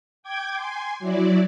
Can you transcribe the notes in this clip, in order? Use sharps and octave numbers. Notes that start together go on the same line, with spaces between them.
G5 D6 G#6
G#5 C6
F#3 E4 D5